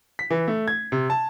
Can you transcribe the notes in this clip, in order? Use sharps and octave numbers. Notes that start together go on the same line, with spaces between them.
B6
E3
A3
G#6
C3
A5